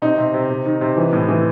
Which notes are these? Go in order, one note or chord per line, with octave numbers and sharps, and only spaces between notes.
C3 D#4
C3
C3
C3
D#3
C3
E3
A2
E3